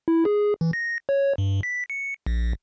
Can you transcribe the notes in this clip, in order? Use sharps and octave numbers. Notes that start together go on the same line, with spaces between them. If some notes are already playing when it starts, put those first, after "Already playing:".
E4
G#4
E3
A#6
C#5
G2
B6
C#7
A#1